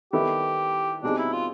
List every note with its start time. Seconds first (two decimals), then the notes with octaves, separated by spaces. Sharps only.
0.13 D#3 G3 B3 E4 G4 A4
1.03 B2 G3 C4 D4 D#4 G#4
1.18 E4
1.33 F4